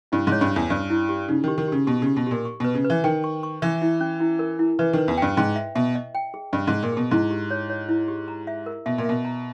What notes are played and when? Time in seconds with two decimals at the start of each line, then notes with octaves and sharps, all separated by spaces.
0.12 G2 E4
0.27 G#2 C#5
0.41 G2
0.51 C#4
0.56 E2
0.70 G2 C#4
0.90 E4
1.09 G4
1.28 C#3 D#4
1.44 D#3 G4
1.58 D#3
1.68 C#3 G4
1.87 B2 G4
2.02 C#3 G4
2.17 B2
2.27 A#2 G4
2.45 C#6
2.60 B2 B4
2.75 C#3
2.85 B4
2.90 E3
3.04 D#3 G5
3.24 C#6
3.43 C#6
3.62 E3 E5
3.82 E4
4.01 C#4
4.20 E4
4.39 A#4
4.59 E4
4.79 E3 B4
4.93 D#3 B4
5.08 E2
5.17 G2 G5
5.37 G#2 G5
5.56 E5
5.75 B2 E5
5.95 D#5
6.15 G5
6.34 G#4
6.53 G2 D#5
6.67 G#2
6.73 G#4
6.83 A#2
6.92 B2 G#4
7.11 G#2 E4
7.31 G4
7.51 C#5
7.70 C#5
7.89 E4
8.08 G4
8.28 A#5
8.47 E5
8.66 A#4
8.86 B2 E5
8.98 A#2
9.05 B2 E5
9.25 A#5